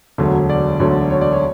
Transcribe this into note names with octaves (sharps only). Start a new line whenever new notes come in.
E1 D2 D3 F#3
D5
E1 D2 D3 F#3 C#5
C#5
D5
C#5